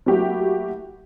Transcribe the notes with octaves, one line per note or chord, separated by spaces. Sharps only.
F#3 A3 A#3 E4 F#4 G4